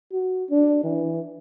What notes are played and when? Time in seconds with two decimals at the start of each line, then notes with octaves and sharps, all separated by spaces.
0.13 F#4
0.50 D4
0.84 E3